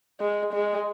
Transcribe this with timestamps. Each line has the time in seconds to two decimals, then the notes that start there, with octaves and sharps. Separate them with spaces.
0.21 G#3
0.54 G#3